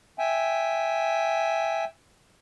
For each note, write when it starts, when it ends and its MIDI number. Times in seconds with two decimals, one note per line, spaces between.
0.19 1.84 76
0.19 1.84 79
0.19 1.84 80